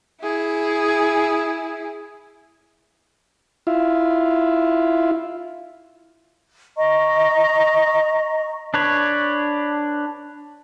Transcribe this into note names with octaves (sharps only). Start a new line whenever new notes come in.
E4 G#4
E4 F4
D#5 A#5 C#6
D4 B4 C#5